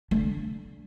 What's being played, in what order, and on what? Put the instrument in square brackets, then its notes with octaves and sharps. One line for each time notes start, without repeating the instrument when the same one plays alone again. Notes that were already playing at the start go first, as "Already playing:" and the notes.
[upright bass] D3